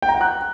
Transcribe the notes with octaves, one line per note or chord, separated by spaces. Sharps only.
G5
A#5
F#5
F#6